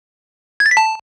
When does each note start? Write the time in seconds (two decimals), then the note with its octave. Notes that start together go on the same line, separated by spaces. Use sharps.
0.60 G#6
0.66 A6
0.71 B6
0.77 A5